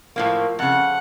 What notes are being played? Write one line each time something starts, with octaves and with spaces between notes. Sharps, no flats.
A2 F3 A#3
F2 C#3 F#5